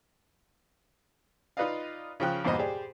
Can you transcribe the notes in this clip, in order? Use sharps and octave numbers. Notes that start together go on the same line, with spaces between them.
D#4 F4 B4 D5 D#5 F5
C#3 F3 G5 F#6
E2 G2 A#2 B3 C5 D#5
G4 G#4 C5 D5